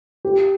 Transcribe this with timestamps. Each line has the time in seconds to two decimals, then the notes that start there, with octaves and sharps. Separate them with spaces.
0.25 G4